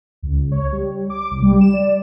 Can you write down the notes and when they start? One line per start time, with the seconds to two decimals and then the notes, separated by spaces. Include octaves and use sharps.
0.22 C#2
0.52 C#5
0.72 G3
1.10 D6
1.30 C2
1.42 G3
1.61 E7
1.73 D5